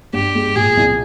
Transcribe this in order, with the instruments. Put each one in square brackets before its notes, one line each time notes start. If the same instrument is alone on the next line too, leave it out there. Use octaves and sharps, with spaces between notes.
[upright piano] G2 [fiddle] G4
[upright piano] G#3
[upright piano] A#2 [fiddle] G#4
[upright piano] C2